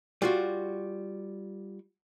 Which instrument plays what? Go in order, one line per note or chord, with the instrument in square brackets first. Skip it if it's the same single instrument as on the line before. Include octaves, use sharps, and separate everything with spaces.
[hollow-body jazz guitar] G3 F4 F#4